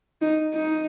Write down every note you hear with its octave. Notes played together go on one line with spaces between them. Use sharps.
D#4
D#4